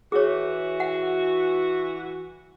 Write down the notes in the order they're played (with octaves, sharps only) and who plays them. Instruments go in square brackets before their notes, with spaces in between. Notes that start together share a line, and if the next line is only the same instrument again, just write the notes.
[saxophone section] E3 F#4 [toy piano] G#4 C#5
[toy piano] F#5